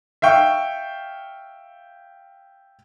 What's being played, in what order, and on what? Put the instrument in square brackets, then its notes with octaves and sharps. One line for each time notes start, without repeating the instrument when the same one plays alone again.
[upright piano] E5 F5 G5 C#6